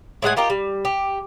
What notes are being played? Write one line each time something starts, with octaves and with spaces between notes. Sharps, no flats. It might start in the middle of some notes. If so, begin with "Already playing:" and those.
A2 G#3 F#5 G#5
F4 G4 A#4 D#5
G3
G4